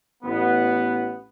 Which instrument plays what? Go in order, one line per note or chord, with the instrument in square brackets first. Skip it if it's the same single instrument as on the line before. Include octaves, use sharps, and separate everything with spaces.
[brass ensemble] A1 B3